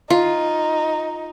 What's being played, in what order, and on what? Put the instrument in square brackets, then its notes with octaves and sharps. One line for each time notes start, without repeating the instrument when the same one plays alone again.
[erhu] D#4 [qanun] F4